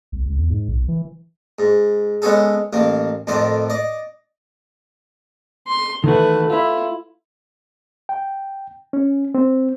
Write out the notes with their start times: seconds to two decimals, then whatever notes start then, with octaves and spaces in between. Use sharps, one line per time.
0.12 C2
0.25 C#2
0.38 E2
0.50 G#2
0.69 B1
0.88 E3
1.59 G#2
2.22 G#3 B3 C#4 G#4 A4
2.73 A1 D#3 A#3
3.27 F2 A2 D#3 C5 D5
3.70 D5 D#5
5.67 C6
6.04 D#3 E3 A3 F#4 B4
6.50 E4 F4
8.09 G5
8.93 C#4
9.35 C4